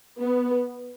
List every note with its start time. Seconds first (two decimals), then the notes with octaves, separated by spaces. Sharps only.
0.20 B3